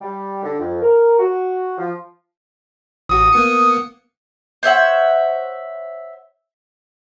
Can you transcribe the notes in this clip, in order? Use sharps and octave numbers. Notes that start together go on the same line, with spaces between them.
G3
D3
F2
A#4
F#4
F3
A1 F#4 D#6
A#3 B3 C#7
C5 C#5 E5 F#5